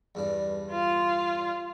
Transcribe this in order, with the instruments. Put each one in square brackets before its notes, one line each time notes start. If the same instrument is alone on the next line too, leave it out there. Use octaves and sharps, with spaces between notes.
[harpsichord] E2 G2 D4
[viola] F4